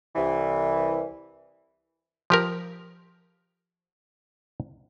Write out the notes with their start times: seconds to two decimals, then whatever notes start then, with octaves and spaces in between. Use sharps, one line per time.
0.16 C2 E3
2.30 F3 G4 A#4